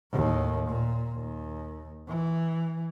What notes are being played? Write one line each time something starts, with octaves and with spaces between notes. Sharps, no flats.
D#2 A2
A#2
D#2
E3